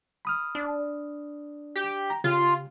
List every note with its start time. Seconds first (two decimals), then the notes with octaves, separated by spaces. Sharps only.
0.25 B5 D#6 F6
0.55 D4
1.75 G4
2.10 A#5
2.24 C#3 F4 G4